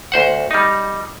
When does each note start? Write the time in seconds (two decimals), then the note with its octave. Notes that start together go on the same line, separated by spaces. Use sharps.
0.12 D2 C5 F#5
0.51 G3 D#4